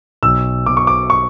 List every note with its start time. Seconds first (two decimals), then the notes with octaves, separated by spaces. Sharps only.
0.23 B1 E6
0.66 B2 D6
0.77 C#6
0.87 D6
1.10 C#6